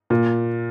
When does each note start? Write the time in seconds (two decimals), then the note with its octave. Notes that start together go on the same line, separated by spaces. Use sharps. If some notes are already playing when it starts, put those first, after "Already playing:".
0.10 A#2